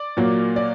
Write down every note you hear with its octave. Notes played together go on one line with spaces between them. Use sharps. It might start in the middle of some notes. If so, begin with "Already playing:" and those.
Already playing: D5
A#2 F#3 A#3
D5